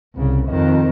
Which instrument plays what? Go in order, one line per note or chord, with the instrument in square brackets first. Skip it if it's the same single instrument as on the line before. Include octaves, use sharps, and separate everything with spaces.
[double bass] C2 C#3
F2 D#3